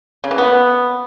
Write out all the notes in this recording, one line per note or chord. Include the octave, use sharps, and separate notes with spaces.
C#3
E3
B3